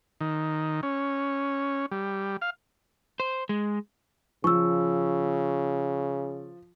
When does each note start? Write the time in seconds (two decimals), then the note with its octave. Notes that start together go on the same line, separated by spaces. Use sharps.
0.21 D#3
0.83 C#4
1.91 G3
2.42 F5
3.20 C5
3.49 G#3
4.44 C#3 F3 C#6 E6